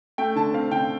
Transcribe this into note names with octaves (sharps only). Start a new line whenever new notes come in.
A3 G5
D3 A5
C4 F5
D3 G5